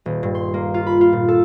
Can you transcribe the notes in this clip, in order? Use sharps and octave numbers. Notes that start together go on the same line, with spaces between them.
D#1
G2
C6
A#3
F4
B5
F4
A#2
A4